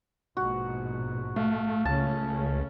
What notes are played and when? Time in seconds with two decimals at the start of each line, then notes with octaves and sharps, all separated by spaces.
0.37 A#1 G#2 B2 F#4
1.36 A3 F5
1.85 C#2 C#3 A3 C#4 A5